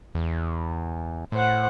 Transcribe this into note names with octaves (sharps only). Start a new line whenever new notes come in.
E2
A2 C5 F#5